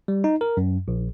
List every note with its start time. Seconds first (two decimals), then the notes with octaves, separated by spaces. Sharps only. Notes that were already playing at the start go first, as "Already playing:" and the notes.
0.08 G3
0.24 D#4
0.41 A#4
0.57 F#2
0.88 A#1